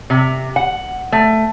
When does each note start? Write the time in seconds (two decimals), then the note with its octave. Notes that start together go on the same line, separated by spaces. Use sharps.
0.10 C3
0.56 F#5
1.12 A3